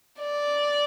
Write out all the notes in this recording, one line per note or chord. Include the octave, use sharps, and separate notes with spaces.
D5